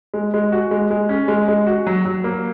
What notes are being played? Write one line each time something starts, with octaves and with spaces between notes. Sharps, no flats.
G#3
G#3
F#4
G#3
G#3
C#4
G#3
G#3
F#4
F#3
F#3
A#3